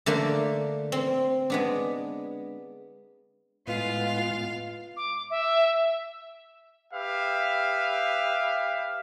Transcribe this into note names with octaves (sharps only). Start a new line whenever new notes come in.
D3 A3 A#3 D4
C4
G#3 B3 D4
A2 G#3 B3 F4 B4 D#5 F5
D6
E5
G4 B4 E5 F5